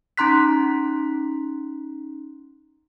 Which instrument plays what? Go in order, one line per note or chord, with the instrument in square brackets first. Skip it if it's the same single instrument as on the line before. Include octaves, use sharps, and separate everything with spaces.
[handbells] C#4 D#4 A#5 C6 F#6 B6